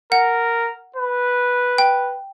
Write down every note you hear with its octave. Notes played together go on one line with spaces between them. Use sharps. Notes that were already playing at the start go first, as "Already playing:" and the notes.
A#4 F#5
B4
G5